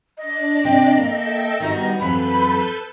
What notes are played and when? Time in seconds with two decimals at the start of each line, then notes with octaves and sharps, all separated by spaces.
0.17 D4 D5 D#5
0.64 C3 G5
0.97 A#3 A4 E5 G5
1.60 D#3 G3 B3 D#4 F#4
2.00 F2 E3 F#3 A4 B4 B5 G6